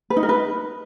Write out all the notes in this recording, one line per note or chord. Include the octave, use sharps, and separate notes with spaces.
B4
D#4
A#4
B4